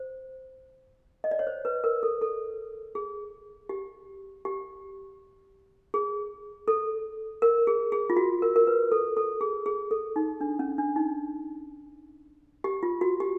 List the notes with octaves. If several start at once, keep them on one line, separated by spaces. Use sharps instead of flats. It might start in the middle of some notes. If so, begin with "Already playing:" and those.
Already playing: C5
D#5
D5
C#5
C5
B4
A#4
A4
A4
G#4
G4
G4
G#4
A4
A#4
G#4
G#4
F4
F#4
A#4
A#4
B4
A4
A4
G#4
G#4
A4
D#4
D4
C#4
D4
D#4
G4
F4
F#4
G4